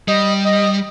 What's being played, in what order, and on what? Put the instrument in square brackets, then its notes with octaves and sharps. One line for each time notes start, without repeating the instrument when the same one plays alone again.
[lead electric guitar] G3 [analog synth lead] D#5
[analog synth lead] D#5